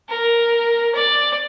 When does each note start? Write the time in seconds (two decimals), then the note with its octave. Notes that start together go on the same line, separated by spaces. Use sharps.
0.10 A#4
0.95 D5